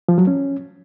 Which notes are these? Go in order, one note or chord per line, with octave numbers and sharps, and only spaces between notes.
F3
F#3
C#4